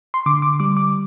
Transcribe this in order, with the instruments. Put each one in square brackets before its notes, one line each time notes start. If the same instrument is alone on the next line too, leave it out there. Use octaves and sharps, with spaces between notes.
[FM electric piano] C6
D3 D6
D6
G3 D6
D6